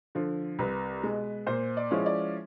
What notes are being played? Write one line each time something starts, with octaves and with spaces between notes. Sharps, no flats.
D3 F3
C2 B4
B2 G#3
A#2 C5
D5
F3 G#3 C#4 E4
D5